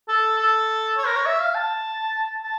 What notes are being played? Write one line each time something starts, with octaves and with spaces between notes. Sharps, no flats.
A4
A4
C#5
A#4
C#5
E5
F5
A5
A5